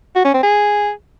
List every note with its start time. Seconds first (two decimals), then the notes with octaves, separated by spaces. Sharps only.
0.16 F#4
0.25 C#4
0.34 C4
0.43 G#4